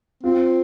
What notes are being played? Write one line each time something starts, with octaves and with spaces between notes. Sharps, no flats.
C4 F4